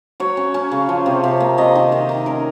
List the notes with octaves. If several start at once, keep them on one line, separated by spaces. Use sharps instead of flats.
F#3 C#5
C#4
C#4
C#3
F3
C3
C3
A#3
C3 D#5
D#3
D#3
D#3
C#4 A#4